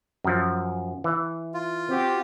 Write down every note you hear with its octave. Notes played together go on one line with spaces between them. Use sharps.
F#2 F3
E3
F4
C4 F#4 G4